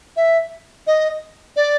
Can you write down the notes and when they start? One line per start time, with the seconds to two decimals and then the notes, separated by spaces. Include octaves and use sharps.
0.17 E5
0.87 D#5
1.56 D5